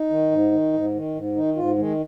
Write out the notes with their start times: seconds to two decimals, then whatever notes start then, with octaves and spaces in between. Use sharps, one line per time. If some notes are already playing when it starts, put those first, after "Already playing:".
Already playing: D#4
0.10 D#3
0.32 G#2
0.52 D#3
0.73 G#2
0.94 D#3
1.15 G#2
1.35 D#3 D#4
1.56 G#2 F4
1.78 D#3 G#3